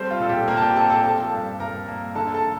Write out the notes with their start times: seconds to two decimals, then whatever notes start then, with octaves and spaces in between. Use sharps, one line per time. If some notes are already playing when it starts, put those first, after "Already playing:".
Already playing: G3 A3 C4 C5
0.11 F4
0.20 A#2 A4
0.29 G4
0.48 A#2 A#3 A#4
0.57 A5
0.62 G4 G5
0.75 C4 A4 A5
0.90 A4 A5
1.04 F3 A4 A5
1.32 G2
1.60 G2 A#4 A#5
1.88 A#3
2.15 D3 A4 A5
2.34 A4 A5